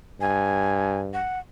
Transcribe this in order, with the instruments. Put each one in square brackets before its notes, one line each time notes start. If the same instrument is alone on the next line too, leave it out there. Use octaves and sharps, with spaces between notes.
[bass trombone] G2 [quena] G#5
[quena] F#5